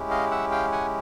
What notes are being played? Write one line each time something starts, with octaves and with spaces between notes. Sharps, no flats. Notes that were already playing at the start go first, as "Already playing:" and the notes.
Already playing: G#3 C#4 E4 G4
D#5 F5
E5 F#5
F5 G5
F#5 G#5